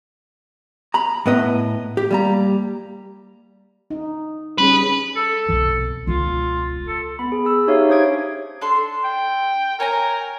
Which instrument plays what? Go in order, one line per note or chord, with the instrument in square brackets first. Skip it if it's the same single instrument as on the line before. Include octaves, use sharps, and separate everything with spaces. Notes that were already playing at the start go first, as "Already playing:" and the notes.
[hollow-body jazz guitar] A#5 B5
A2 B3 B4 D#5
G4
G3 A#3 A#5
[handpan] D#4
[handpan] G3 C#4 G#4 [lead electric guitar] B4
[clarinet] A4
[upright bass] B1 C3
[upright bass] E1 C#2 [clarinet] F4
[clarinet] A4
[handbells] B3 B5
G#4
G#4 E6
D#4 G4 C#5 E5 F5
D4 C5 C#5 D#6 G#6 D7
[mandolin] D4 A4 C6
[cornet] G5
[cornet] A#4 [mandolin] C#5 G#5 A#5